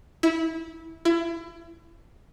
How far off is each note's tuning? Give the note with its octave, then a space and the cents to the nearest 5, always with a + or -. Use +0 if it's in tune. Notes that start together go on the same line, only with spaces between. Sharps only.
E4 -20
E4 +30